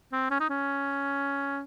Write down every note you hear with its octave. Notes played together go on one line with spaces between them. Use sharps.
C4
C#4
D#4
C#4